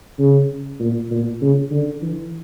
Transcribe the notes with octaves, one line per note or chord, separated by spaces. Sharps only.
C#3
A#2
A#2
C#3
D3
E3